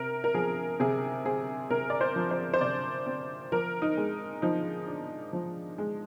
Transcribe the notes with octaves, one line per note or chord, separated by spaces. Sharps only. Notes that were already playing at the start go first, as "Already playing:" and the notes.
Already playing: C3 A#4
A#4
F3 G#4
C3 G#4
C4 G#4
C3 A#4
D5
C5
F3
C5
C5
C3 D5
C4
F3 A#4
D#4
G#3
F3 D#4
D4
F3
G#3